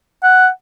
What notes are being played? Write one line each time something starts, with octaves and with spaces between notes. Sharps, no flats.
F#5